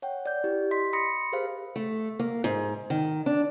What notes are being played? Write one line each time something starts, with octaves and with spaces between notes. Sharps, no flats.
C#5 F#5 G5
D5 G6
E4 G4
D#5 C6 B6
B5 C6 D#6 A#6 C#7
G4 G#4 A#4 C5 F5
A3
A#3
G#2
D#3
D4